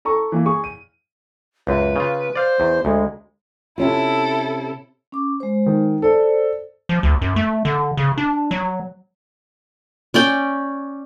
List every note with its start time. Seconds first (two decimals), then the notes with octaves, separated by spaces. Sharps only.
0.05 A4 A#5 C#6
0.32 E3 A#3
0.45 G#4 C#6
0.64 D#7
1.67 C#2 F#2 B4
1.96 C#3 F4
2.35 C5 D5 F5
2.60 E2
2.85 D2 G#3
3.78 C3 C#4 E4 F4 A4
5.12 C#4 D6
5.40 G#3 C5
5.66 D#3
6.02 A4 C5 D5
6.89 F3
7.03 D2
7.21 F#2
7.36 A3
7.65 D3
7.97 C#3
8.18 D4
8.51 F#3
10.14 C#4 D5 G5